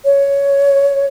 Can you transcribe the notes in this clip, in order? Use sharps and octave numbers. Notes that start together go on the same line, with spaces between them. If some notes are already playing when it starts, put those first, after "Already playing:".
C#5